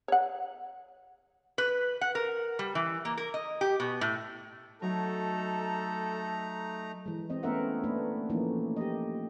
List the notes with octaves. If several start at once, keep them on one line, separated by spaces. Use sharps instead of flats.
C#5 F#5
B4
F#5
A#4
G3
E3
A#3
A#4
D#5
G4
B2
A2
F#3 A3 D#4 A4 A#5
E3 G#3
C4 D#5
A3 B3 C#4 A#4 E5 F#5
A3 A#3 D4 B4
E3 F3 A3 A#3 C#4 D#4
G4 D#5